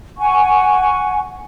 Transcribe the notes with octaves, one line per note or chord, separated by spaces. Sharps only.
F#5 G#5 C#6